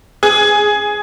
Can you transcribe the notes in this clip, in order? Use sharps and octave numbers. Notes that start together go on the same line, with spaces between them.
G#4